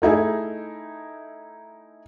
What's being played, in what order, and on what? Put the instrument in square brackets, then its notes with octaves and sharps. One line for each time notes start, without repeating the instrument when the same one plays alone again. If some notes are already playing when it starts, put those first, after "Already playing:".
[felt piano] A3 D#4 E4 G#4